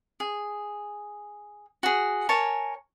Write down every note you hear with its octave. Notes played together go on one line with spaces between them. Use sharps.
G#4
F#4 G#4
A#4 C#5 G#5 A5